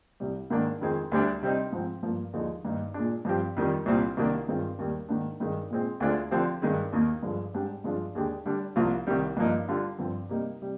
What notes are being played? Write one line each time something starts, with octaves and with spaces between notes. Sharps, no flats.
C2 C3 G3
G#2 D#3 A#3 D4
F2 D#3 G#3 C4
D2 D3 G3 D4
C3 G3 C4 D#4
G#2 F3 C4
G2 F3 A#3
D#2 D3 F3 G#3 D#4
G2 D#3 A#3 D#4
A#2 G#3 D4
G2 F3 C4 G4
F2 D#3 G3
C2 A#2 G3 C4
C2 C3 D#3 A#3 D4
G2 D#3 G#3 C4 F4
D#2 D#3 G3 A#3
G#2 D#3 A#3 D4
G2 D#3 G#3 D#4
A#2 G#3 C4
D2 D3 G#3 D4 F4
D3 F3 C4 G4
G2 D#3 G#3
D#2 D#3 A#3
G2 D3 F3 G#3
G#2 G3 D4 G4
G2 F3 G#3 D4 F4
D#2 D3 G#3 D4 G4
D3 G3 D4
C2 C3 F3 A#3 F4
C2 C3 D#3 G3
G2 F3 A#3 D#4
D3 G3 D4 F4
G2 D3 F3 C4
C3 G3 A#3 D#4
C3 G3